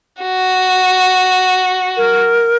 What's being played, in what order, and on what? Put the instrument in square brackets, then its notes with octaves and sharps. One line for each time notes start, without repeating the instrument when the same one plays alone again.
[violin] F#4
[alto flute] A#4